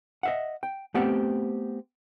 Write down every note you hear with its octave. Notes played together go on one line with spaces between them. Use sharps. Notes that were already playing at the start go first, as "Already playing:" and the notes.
D#5 E5 F#5
G5
A3 B3 C4 G4 F#5 G5